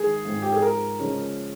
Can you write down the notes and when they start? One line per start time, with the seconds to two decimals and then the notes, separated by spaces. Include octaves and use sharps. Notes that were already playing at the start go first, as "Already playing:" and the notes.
Already playing: D#3 G#3 G#4
0.25 G#2 F3 C4
0.42 G4
0.52 G#4
0.62 A#4
0.99 C#3 F3 G#3 C#4